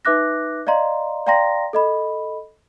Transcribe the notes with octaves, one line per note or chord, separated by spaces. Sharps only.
D#4 B4 E5 D6 F#6 A#6
D5 D#5 F5 A#5 C6
D5 F5 G5 A#5 C6 A#6
A4 D#5 B5